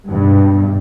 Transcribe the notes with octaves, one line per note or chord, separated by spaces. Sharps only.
G2 B2